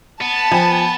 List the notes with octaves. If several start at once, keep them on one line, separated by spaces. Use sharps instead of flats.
B3 A5
F3 G5 G#5 B5